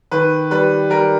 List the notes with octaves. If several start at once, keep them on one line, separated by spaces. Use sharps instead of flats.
D#3 B4
G3 B4
G3 A#4